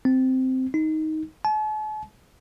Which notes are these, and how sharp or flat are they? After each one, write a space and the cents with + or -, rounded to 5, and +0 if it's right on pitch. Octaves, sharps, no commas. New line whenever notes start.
C4 -10
D#4 +10
A5 -45